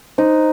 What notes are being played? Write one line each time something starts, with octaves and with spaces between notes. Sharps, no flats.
D#4 C5